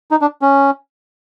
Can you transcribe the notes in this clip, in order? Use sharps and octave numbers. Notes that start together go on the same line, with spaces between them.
D#4
D4
C#4